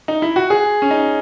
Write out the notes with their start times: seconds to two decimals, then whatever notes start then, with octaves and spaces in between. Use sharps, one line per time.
0.08 D#4
0.22 E4
0.36 F#4
0.50 G#4
0.82 C#4
0.91 D#4